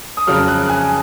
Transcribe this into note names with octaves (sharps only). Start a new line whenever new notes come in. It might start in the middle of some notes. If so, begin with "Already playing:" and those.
D#6
F2 C#3 F#3 F6
F#6
G#5